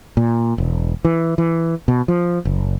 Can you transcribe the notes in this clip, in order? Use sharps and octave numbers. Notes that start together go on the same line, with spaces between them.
A#2
E1
E3
E3
B2
F3
F#1